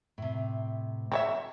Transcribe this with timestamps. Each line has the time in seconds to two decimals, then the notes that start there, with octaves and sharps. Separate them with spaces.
0.18 A2 C3
1.12 C4 F#4 C#5 E5